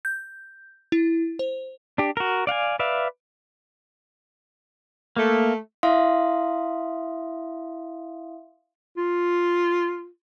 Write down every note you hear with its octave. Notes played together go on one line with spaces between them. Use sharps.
G6
E4
C5
D4 G4
F#4 A#4
D5 F5 F#5 G#5
B4 D5 E5 F5
A3 A#3
E4 E5 F5 C6 D#6
F4